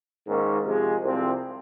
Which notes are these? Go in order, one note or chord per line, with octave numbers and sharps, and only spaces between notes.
G#2 D#3 A#3 C#4
C3 F3 G#3
C2 C3 F3 C4